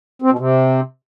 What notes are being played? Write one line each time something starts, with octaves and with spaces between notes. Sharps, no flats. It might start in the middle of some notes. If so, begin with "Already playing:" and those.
C4
B2
C3